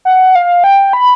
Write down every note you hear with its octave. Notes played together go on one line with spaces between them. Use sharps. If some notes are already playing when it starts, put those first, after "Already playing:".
F#5
F5
G5
B5